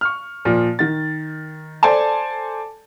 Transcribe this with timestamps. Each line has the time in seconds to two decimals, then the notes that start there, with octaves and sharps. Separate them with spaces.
0.01 C#6 F6
0.45 A#2 F3
0.79 D#3 A6
1.83 A4 C5 D5 G#5 A5